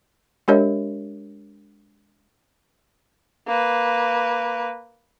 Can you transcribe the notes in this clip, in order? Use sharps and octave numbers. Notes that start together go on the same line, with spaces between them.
G#3 D4 G4 A#4 C#5 D#5
A#3 B4